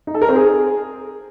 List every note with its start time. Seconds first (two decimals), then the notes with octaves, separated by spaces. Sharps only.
0.07 D#4
0.14 A4
0.22 A#4
0.29 C4
0.36 G#4